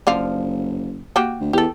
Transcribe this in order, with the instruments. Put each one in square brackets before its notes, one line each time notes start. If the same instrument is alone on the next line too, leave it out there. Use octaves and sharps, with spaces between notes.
[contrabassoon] F#1 [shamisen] D3 F3 F5
[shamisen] A#3 F#4 G4
[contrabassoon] D2
[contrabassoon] E2 [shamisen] G4 A4